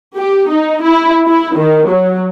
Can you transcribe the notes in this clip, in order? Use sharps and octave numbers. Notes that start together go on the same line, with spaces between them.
G4
D#4
E4
E4
D#3
F#3